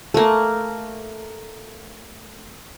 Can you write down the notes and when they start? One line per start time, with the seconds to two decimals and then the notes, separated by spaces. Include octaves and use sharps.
0.14 A3 A#3